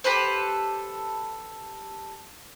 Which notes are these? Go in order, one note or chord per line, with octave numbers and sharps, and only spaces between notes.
G4 A4 B4 C5